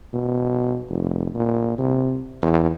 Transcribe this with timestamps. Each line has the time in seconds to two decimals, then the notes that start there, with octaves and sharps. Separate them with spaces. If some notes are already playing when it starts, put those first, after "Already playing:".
0.14 B2
0.89 F1
1.35 A#2
1.78 C3
2.42 E2